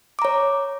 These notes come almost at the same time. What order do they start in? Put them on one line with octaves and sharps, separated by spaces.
D6 A#5 C#5